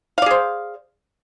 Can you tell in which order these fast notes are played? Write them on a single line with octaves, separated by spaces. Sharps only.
F5 D5 G#4 C5